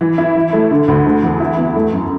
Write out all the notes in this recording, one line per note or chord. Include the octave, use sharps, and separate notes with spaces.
E3
E4
E3
A3
D3
D2
A3
E2
E4
B3
A3
F#2